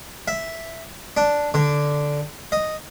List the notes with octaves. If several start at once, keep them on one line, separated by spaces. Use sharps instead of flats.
E5
D4
D3
D#5